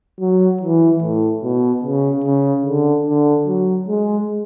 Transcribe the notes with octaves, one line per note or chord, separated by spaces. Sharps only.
F#3
E3
A2
B2
C#3
C#3
D3
D3
F#3
G#3